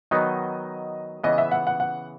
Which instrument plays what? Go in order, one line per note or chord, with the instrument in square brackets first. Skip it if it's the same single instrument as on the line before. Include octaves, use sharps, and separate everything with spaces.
[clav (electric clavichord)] D#3 F#3 B3 D#4 [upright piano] D#5
[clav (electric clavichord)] C#3 E3 B3 [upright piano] D#5
[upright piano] E5
F#5
F#5
F#5